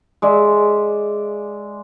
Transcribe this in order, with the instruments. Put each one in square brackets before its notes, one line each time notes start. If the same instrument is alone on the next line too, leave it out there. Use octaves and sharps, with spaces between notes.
[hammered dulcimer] G#3 D5 E5